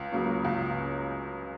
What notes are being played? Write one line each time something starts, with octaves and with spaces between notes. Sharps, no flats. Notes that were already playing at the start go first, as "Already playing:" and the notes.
Already playing: C#2
C#3 F#3 A#3 C#4
C#2